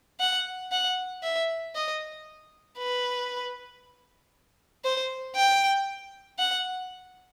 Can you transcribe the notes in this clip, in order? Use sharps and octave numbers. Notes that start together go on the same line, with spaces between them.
F#5
F#5
E5
D#5
B4
C5
G5
F#5